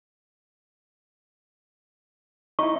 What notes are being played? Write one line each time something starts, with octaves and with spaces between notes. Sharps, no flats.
D#4 E4 C#6